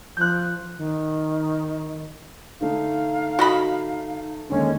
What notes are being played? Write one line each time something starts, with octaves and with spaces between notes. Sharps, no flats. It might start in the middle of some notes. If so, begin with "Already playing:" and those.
F3 F#6 G6
D#3
D3 A3 D#4 F5
F#4 D#5 B5
D#2 D3 G#3 C#4